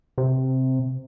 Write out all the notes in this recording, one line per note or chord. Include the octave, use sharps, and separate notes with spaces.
C3